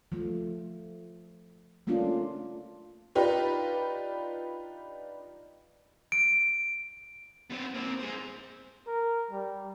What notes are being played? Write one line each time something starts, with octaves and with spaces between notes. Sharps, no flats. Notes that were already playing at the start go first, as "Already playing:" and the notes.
F3 A3
A3 A#3 C#4 D4 F4
D4 D#4 F4 G4 B4
D7
B3 C4
A#3 C4
G#4 C5
A#4
G3